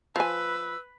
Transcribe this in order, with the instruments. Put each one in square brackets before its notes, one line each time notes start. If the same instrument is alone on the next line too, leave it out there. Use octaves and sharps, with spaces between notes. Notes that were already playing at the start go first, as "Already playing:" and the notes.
[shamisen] F3 G#5 [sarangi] B4 [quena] E6